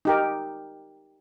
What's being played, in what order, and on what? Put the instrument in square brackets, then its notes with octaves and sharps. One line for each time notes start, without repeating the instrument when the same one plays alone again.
[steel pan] D#4 G4 A#4